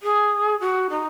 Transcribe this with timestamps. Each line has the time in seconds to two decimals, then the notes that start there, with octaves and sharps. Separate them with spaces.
0.02 G#4
0.60 F#4
0.90 D#4